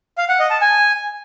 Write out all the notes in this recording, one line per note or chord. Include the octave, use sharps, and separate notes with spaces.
F5
F#5
D#5
A5
G#5